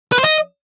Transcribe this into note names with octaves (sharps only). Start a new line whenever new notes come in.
B4
C5
D#5